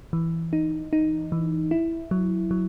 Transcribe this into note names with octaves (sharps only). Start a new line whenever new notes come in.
E3
D#4
D#4
E3
E4
F#3
F#3